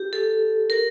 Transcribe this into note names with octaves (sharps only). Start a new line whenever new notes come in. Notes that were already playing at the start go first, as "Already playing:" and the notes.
Already playing: G4
A4
A#4